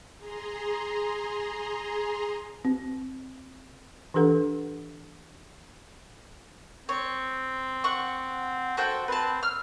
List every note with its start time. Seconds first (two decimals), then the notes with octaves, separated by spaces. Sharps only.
0.19 G#4 A#5 C6
2.65 C4
4.14 E3 D4 G4 A4 B4 F#5
6.89 C4 C#5
7.84 F#5 C#6
8.77 F#4 A4 C5 G5
9.08 C4 B4 A5
9.43 E6 F6